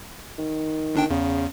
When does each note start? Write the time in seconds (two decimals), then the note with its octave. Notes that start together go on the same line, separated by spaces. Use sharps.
0.38 D#3
0.95 G1 D4 G5
1.10 E2 C#3